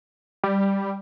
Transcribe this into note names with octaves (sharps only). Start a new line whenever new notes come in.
G3